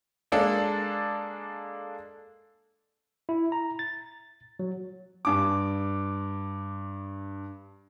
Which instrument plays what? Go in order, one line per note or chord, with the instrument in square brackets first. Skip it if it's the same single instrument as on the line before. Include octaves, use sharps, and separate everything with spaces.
[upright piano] G#3 A#3 D4 A4
[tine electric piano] E4
A#5
A6
F#3
[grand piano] G2 D6